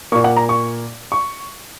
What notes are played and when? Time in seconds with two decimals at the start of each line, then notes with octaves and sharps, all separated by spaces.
0.12 A#3 C#6
0.15 A#2
0.24 F#5
0.36 A#5
0.49 C#6
1.12 C#6